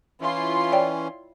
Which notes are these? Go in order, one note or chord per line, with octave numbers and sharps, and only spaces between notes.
E3 C#4 E4 F4 C6
C#5 D5 G5